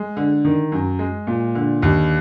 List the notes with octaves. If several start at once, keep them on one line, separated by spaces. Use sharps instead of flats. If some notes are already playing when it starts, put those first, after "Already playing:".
Already playing: G#3
D3
D#3
F#2
G#3
A#2
D3
D#2